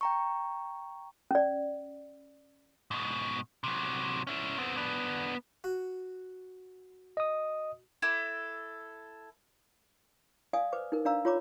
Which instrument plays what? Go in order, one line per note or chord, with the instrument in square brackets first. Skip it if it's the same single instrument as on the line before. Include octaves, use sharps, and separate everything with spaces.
[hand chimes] G5 A#5 C#6
[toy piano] C#4 D5
[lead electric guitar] G#2 B2
C3 F#3
C#4 E4
B3 C4
B3 D4
[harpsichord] F#4
[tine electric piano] D#5 D#6
[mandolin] E4 A4 D6
[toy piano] D5 F5 G#5 D#6
B4 C5 D6
D#4 A#4
D4 D5 F5 A#5 E6
F4 C#5 A#5 D6